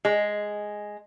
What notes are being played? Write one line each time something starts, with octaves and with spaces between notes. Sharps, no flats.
G#3